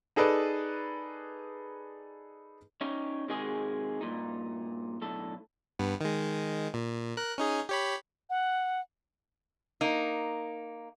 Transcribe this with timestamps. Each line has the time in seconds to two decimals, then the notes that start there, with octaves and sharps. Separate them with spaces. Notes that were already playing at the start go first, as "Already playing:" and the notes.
0.16 D#4 G#4 A4 B4 D5
2.81 C#4 D#4 G4 C#5
3.28 C3 D#3 G#3 F#4 G#4
4.01 G2 A#2 D#4
5.01 B1 A2 D3 A4
5.79 G2 B3
6.01 D#3 G#3
6.74 A#2
7.17 A#4 F#6
7.38 C#4 D#4 G#4
7.69 G4 C#5 B5
8.30 F#5
9.81 A#3 D#4